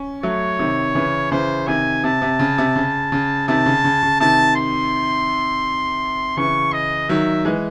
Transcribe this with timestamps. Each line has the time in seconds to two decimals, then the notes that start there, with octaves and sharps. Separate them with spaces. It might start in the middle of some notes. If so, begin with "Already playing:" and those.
Already playing: C#4
0.23 F#3 A3 C#5
0.59 C3 D#3
0.95 C#3 E3
1.31 C#3 E3 C5
1.67 C3 D#3 G#5
2.04 C3 A5
2.22 C3
2.39 C#3
2.58 C3
2.76 C#3
3.12 C#3
3.48 C3 D#3 A5
3.66 C#3
3.84 C#3
4.03 C#3
4.20 C3 D#3 A5
4.56 C6
6.37 C#3 E3 C#6
6.73 D#5
7.09 D#3 F#3 E5
7.45 E3 G#3